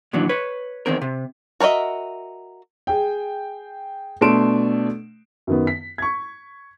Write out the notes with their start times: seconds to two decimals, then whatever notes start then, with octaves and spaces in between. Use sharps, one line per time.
0.13 A#2 D#3 E3 F#3 D4
0.29 B4 C#5
0.86 E2 D#3 C4 A#4
1.02 C3
1.60 F#4 A#4 C#5 D#5 E5
2.87 G#4 G5
4.21 B2 A3 D4 C6 D7 E7
5.47 F#2 D#3 B3
5.67 B6
5.98 C#6 G#6